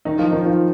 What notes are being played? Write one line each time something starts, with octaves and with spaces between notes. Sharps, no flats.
D#3 D#4
F3 F4
D#3 D#4
F3 F4